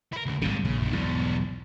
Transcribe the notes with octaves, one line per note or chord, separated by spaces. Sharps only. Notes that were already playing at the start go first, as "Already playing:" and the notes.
E4 A#4
D2 C#3
G#1 F#2 C#3 G3 A#3
A#1 C#3
F#2 D3
B1 E2 G#2 B2 G3